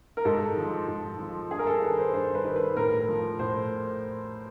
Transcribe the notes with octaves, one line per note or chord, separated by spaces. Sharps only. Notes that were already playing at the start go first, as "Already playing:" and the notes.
A#4
G#2 A4
F3
G#2
F3
G2 G#4
A#4
A4
D#3 B4
C5
G2 C5
B4
D#3
B4
A2 A#4
F3
A2 C5